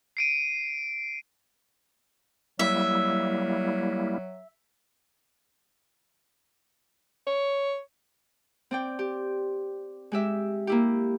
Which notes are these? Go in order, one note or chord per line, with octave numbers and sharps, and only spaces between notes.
C7 D7 D#7
F#3 G3 A#3 E4 E5
C#5
C4 D5 G5
G4
G#3 G4 E5
A#3 E4 G4